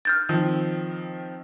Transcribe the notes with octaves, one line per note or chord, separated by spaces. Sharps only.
F6 G6 A6
D#3 F3 C4